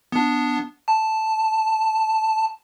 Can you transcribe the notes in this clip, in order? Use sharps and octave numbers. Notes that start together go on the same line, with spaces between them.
B3 D4
A5